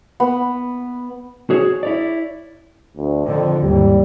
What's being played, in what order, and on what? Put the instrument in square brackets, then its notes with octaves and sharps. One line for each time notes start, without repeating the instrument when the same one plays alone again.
[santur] B3
[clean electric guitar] F#4 G#4 C#5
E4 C#5 D5
[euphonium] D2
[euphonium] F2 [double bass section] D3 D#3
[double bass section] D#2 G#2 E3 [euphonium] G3